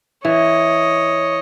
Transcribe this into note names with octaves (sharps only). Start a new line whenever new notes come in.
E3 C#5 D#5